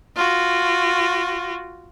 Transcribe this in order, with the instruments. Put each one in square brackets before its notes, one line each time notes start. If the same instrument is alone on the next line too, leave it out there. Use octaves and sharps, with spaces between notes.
[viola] F4 F#4